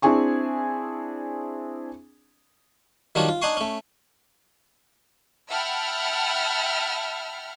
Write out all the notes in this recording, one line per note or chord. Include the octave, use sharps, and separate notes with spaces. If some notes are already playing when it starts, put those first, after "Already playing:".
C4 D4 E4 G#4 G#5 C#6
D#3 F#3 G3 D4 F4 C#5
F4
D4 D#4 F#5 G#5 C6 C#6
A3 C#4
E5 F#5 G5 A5 B5 F6